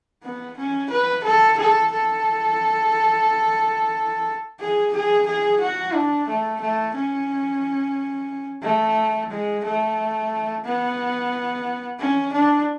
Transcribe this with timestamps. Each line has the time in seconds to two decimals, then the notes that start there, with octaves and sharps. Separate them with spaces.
0.23 B3
0.57 C#4
0.90 B4
1.24 A4
1.58 A4
1.91 A4
4.60 G#4
4.93 G#4
5.26 G#4
5.61 F#4
5.94 D4
6.28 A3
6.61 A3
6.95 C#4
8.63 A3
9.30 G#3
9.64 A3
10.64 B3
11.99 C#4
12.33 D4